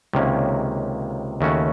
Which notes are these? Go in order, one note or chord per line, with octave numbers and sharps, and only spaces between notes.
C#2 C3 D#3 A#3 C#4
D#2 C#3 A3 C#4 F#4